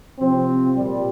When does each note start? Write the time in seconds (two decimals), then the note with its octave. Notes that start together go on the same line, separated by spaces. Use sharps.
0.19 C3 F3 C4
0.76 A#2 F3 G3